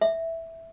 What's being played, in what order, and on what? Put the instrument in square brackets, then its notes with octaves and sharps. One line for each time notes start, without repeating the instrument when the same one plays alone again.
[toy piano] E5